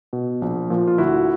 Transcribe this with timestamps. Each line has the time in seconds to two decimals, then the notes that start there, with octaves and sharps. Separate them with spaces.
0.13 B2
0.42 A#1
0.70 A#2 F3
0.87 F4
0.98 D2 E4 F#4